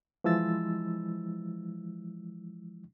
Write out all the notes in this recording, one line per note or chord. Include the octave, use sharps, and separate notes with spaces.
E3 F3 G#3 E4 E6 A6